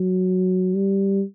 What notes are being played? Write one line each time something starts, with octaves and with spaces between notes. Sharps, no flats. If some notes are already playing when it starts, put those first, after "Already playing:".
Already playing: F#3
G3